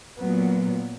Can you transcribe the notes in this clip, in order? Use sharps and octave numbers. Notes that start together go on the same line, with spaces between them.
A#2 F#3 B3